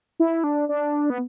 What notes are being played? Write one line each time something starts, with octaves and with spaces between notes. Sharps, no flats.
E4
D4
D4
B3